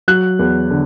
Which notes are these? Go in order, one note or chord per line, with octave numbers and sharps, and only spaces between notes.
F#3 F#6
E2
D3